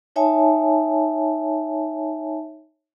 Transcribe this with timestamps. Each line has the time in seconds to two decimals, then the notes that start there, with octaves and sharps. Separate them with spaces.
0.16 D#4 C#5 E5 G#5 A5